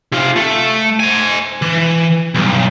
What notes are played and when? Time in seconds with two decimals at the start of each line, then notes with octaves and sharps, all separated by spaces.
0.12 C3 F4
0.36 A3
1.00 C5 G#5
1.62 E3
2.35 B1 G2